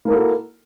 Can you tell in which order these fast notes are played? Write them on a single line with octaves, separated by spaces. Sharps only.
A#3 A#4 E4 A4 F#4